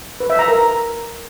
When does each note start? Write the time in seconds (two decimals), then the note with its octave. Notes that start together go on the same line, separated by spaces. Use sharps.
0.20 B4
0.30 E5
0.39 A#5
0.48 A#4